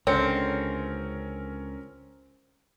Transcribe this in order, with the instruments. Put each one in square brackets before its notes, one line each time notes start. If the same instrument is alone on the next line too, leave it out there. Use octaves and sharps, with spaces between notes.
[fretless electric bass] C#2 D3 [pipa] C4 [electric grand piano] C#4 A#4 C#7 [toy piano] C#5